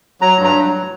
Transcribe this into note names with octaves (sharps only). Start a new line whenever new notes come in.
F#3 A#5
G2
A#5
F#3